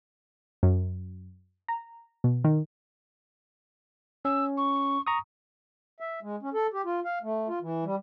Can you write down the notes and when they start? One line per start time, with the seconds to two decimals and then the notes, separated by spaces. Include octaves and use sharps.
0.63 F#2
1.68 A#5
2.24 B2
2.44 D#3
4.25 C#4 E6
4.57 C#6
5.07 A#5 C#6 D#6
6.00 E5
6.23 G#3
6.42 C#4
6.54 A4
6.74 G4
6.85 F4
7.05 F5
7.23 A3
7.48 F4
7.62 E3
7.84 G3